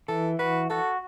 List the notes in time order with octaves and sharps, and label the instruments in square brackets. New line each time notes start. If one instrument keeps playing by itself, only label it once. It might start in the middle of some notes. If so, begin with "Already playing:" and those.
[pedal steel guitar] E3 [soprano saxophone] A4
[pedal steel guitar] F#4 [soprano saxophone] B4
[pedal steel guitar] F#4 [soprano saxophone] A4